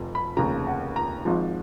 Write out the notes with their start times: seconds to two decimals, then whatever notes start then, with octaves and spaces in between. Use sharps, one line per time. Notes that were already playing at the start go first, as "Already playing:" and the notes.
Already playing: F1 F2
0.15 B5
0.37 F1 D#2 C#3 A#5
0.67 F#5
0.96 A#5
1.25 G#1 G#2 F3